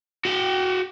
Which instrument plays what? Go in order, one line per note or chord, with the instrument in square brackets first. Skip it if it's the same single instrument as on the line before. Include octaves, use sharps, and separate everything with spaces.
[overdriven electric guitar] F#4 G5